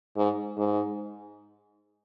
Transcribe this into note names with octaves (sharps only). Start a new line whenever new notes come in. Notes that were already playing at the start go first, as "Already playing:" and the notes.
G#2
G#2